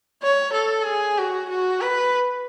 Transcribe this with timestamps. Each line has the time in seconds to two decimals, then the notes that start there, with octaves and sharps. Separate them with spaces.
0.23 C#5
0.53 A4
0.85 G#4
1.18 F#4
1.50 F#4
1.81 B4